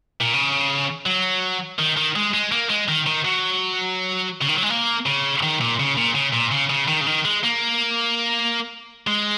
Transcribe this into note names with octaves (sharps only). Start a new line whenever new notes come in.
A#2
C#3
F#3
D#3
D#3
G#3
G#3
A#3
G#3
D#3
D#3
F#3
C#3
D#3
F#3
G#3
A#3
C#3
D#3
A#2
C#3
A#2
C#3
A#2
C#3
C#3
D#3
C#3
D#3
G#3
A#3
G#3